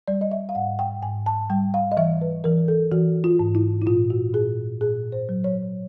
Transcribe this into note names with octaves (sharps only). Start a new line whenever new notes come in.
G3 D5
D#5
E5
F5
G#2 F#5
G5
G#2 G#5
A5
G3 G5
F5
D#5
E3 E5
B4
E3 A#4
A4
E3 F#4
F4
G#2
E4
E4
A#2 F4
F#4
A#2 G#4
A#2 G#4
C5
F#3
C#5